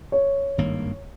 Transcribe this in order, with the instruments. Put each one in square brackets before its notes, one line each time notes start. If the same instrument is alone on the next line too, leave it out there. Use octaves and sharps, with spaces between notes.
[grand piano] C#5
[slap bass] G#1 G2 D#3 A#3